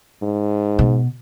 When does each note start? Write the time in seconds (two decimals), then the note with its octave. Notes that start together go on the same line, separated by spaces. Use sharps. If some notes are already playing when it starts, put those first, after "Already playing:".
0.22 G#2
0.79 B2